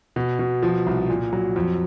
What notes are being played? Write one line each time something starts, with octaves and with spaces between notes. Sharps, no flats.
B2
B2
F3
C2
A#2
F#3
F2